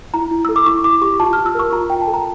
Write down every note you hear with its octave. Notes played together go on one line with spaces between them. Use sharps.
E4 A#5
E4
A4 E6
D6
E4 C#6
E4 D6
G4 C#6
F4 A5
F6
F4
E6
A#4 C#6
F4 A#5
F4 G5
A5
A4
A#5